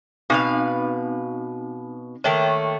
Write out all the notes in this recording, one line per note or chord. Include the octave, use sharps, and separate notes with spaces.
B2 C4 D#4 B4 F5
D#3 A3 A#3 C#5 E5 G5